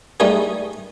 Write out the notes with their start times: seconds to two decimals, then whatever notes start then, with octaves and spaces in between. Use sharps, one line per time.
0.20 G3 A3 D#4 G#4